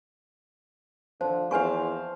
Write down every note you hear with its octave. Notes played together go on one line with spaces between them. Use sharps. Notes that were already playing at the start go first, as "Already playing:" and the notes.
D3 F3 C5
E2 B4 C5 F5 G#5 C#6